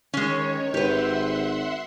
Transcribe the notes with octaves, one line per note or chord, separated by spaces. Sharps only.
D#3 G#3 C#4 C#5
G#1 G4 B4 E5 F#5 C6